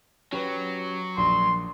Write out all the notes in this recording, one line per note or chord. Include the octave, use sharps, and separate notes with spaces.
F#3 C#4 G4 B4
A#1 C6